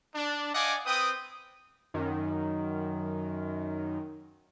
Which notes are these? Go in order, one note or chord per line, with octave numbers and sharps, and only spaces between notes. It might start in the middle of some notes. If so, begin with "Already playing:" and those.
D4
D5 D#5 F5 F#5 G#5 D6
C4 B4 G5 D#6
F#2 D#3